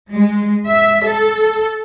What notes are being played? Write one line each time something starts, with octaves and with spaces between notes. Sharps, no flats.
G#3
E5
A4